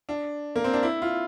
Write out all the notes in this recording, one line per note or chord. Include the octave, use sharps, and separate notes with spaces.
D4
A#3
C4
D4
E4
F4